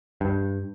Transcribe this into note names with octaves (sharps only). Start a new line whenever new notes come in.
G2